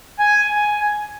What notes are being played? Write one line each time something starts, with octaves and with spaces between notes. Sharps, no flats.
G#5